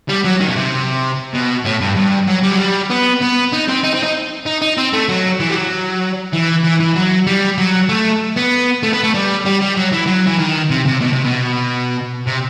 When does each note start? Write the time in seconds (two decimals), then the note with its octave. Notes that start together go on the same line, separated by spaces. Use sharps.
0.09 G3
0.25 F#3
0.41 D#3
0.48 B2
0.56 C3
1.34 B2
1.65 A2
1.81 G2
1.96 G2
2.27 F#3
2.43 G3
2.51 F#3
2.59 G3
2.90 B3
3.21 B3
3.52 D#4
3.68 C4
3.84 D#4
3.93 C4
4.03 D#4
4.46 D#4
4.62 D#4
4.77 C4
4.93 A3
5.09 F#3
5.40 E3
5.49 G3
5.55 F#3
6.33 E3
6.64 E3
6.80 E3
6.96 F#3
7.27 G3
7.58 F#3
7.89 A3
8.36 B3
8.83 A3
8.93 B3
9.04 A3
9.14 G3
9.45 G3
9.61 G3
9.77 F#3
9.93 E3
10.07 F#3
10.27 E3
10.39 D#3
10.70 C3
10.86 C3
11.01 B2
11.12 C3
11.24 B2
12.27 C3